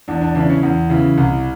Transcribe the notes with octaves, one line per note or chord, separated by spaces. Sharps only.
E2 D4
D4
C#3 E3 D4
C#4
E2
C#3 E3
C2